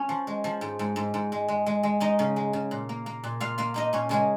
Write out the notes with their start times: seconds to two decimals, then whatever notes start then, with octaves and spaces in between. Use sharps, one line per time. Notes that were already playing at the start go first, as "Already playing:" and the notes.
Already playing: C#4 C#5
0.09 F3
0.27 G#3
0.44 F3
0.61 G#2
0.79 G#2
0.96 G#2
1.14 G#2
1.32 G#3
1.48 G#3
1.66 G#3
1.83 G#3
2.00 G#3 D#4 D#5
2.19 C#3
2.36 G#3
2.53 C#3
2.71 A#2
2.89 A#3
3.06 A#3
3.24 A#2
3.40 A#2 F4 F5
3.58 A#3 F4 F5
3.74 A#3 D#4 D#5
3.93 A#2 C#4 C#5
4.09 C#3 G#3 G#4